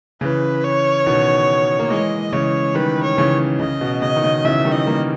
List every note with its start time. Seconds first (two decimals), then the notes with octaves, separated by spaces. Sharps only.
0.21 C#3 E3 B4
0.64 C#5
1.06 B2 D#3
1.79 A#3
1.90 E3 G#3 D#5
2.32 C#3 E3 C#5
2.75 D#3 G3 B4
3.03 C#5
3.17 C#3 E3
3.59 C#3 D#5
3.81 B2
4.02 C#3 D#5
4.16 D#3
4.24 C#3
4.44 C#3 E3 E5
4.65 D#3 G3
4.72 D#5
4.86 G3 A#3